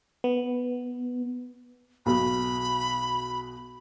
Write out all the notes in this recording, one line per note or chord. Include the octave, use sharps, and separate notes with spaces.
B3
B1 B2 B5